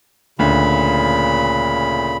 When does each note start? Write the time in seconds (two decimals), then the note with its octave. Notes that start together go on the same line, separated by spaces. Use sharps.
0.39 D2 A#2 C#3 B5